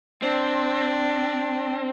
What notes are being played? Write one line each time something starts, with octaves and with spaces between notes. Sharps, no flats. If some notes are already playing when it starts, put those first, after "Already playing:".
C4 D4